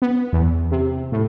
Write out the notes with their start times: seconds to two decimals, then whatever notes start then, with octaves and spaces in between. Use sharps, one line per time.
0.02 B3
0.33 E2
0.71 C3
1.12 A2